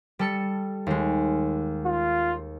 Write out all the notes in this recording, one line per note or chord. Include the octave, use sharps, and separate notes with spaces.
G3 A4 C#7
D#2 G#3
F4